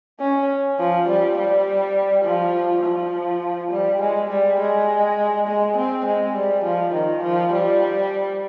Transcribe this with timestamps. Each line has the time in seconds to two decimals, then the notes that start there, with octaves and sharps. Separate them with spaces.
0.20 C#4
0.79 F3
1.08 G3
1.37 G3
2.24 F3
2.84 F3
3.71 G3
4.01 G#3
4.30 G3
4.60 G#3
5.47 G#3
5.77 C4
6.05 G#3
6.35 G3
6.64 F3
6.93 D#3
7.23 F3
7.52 G3